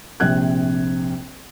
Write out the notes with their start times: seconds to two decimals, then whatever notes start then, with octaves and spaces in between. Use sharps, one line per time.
0.20 A#1 C3 C4 F#6 G#6